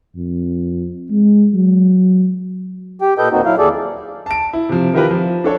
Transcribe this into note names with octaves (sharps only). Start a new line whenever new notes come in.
F2
G#3
F#3
G4 G5
A#2 A4 B4 D#5 G5 G6
D#2 A#2 A#3 C4 D#4 F#4
F#3 E4 F5
D#2 G#4 A4 D5
A5 D7
E4
C3 F3
D#3 E4 F4 G4 A#4 B4
F3
D4 A4 C#5